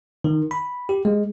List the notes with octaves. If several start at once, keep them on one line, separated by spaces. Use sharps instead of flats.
D#3
B5
G4
G#3